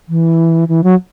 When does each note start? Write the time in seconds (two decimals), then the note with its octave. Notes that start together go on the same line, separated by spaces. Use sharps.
0.09 E3
0.68 E3
0.84 F#3